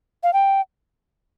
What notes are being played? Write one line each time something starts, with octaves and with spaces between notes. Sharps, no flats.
F5
G5